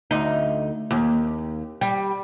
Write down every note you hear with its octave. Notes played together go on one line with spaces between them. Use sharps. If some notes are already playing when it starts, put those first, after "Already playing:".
D2 D#4
D#2
G3